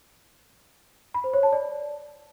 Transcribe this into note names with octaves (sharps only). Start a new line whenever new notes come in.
B5
C5
C#5
A5
D5